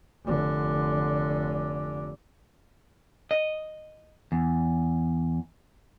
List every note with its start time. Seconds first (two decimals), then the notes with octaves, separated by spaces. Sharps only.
0.25 F1 D3
3.31 D#5
4.32 E2